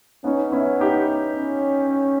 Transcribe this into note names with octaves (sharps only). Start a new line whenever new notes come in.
B3 C#4 D#4
B3 C#4 E4
D#4 G4
C#4